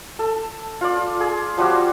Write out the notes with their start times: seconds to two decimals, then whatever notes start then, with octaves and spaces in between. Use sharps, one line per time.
0.19 A4
0.81 F4 D5
1.20 G#4
1.58 F3 G3 F#4 D6